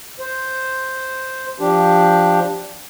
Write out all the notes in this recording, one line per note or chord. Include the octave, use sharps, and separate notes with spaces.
C5
F3 D4 G4